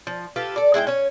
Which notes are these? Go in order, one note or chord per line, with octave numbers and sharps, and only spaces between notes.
F3
F4 G4 A4 B4
A4 D5
G#3 E4 F#5 G5
C#4 C#5